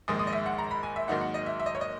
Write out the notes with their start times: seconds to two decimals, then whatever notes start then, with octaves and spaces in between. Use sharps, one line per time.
0.08 A#1 G#2 D#3 G#3 D#6
0.19 D#6
0.27 D#5
0.33 E5
0.46 F#5
0.58 A#5
0.71 B5
0.83 G#5
0.96 E5
1.08 G#2 D#3 F#3 A#3 D#4 F#5
1.21 F#5
1.34 D#5
1.46 E5
1.60 E5
1.66 D#5
1.75 C#5
1.81 D#5